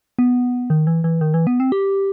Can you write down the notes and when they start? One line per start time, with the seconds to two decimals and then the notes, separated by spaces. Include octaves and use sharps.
0.19 B3
0.70 D#3
0.87 E3
1.04 E3
1.21 D#3
1.34 E3
1.47 B3
1.60 C4
1.72 G4